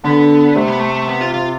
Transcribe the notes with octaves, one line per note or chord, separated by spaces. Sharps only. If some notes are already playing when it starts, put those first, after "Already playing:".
D3 B3
C3 A3
B3
A3
B3
F4
F4